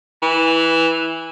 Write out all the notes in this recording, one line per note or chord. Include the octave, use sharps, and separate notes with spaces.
E3